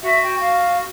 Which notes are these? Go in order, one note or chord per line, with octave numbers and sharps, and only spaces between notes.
F#4 E5
G5
F5